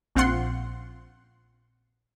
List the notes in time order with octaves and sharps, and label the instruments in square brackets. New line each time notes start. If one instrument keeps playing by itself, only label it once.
[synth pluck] A#1 C4 F4 F#5 C6 C#7